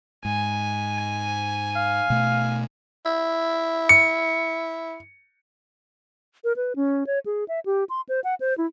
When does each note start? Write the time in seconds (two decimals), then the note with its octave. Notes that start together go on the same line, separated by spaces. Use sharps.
0.25 G#2 G#5
1.76 F5
2.10 B2 A3
3.06 E4
3.89 C#7
6.44 A#4
6.56 B4
6.76 C#4
7.07 C#5
7.26 G#4
7.48 E5
7.66 G4
7.89 C6
8.09 C5
8.24 F#5
8.40 C5
8.58 E4